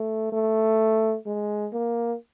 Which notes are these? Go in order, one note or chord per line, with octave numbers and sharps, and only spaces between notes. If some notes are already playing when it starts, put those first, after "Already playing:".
Already playing: A3
A3
G#3
A#3